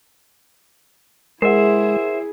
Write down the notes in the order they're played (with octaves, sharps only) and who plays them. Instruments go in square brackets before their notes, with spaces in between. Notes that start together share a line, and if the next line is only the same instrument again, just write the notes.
[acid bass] G#3 [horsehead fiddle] E4 G#4 [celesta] A#4 F#5 [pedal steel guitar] C5 E5